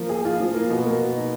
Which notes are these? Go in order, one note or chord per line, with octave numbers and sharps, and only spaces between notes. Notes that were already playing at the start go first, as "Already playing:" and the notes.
Already playing: F3 A#3
G#4
F4
F3
A#3
B2
A#3
B2
D#4